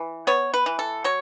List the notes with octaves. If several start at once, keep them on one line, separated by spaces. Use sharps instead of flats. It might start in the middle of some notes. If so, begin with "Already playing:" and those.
Already playing: E3
B3 C#5
B4
E3
A4
F#3 C#5